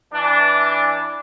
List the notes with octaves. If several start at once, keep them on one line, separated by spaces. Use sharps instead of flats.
E3 D4